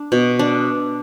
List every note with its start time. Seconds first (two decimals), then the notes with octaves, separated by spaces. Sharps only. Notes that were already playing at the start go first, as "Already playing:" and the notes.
Already playing: D4
0.12 B2
0.39 D4